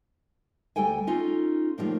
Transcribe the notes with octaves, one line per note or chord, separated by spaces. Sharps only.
D2 G3 A4 G5 G#5
C#4 D#4 F4 A4
A2 D#3 F3 G3 A#3 F4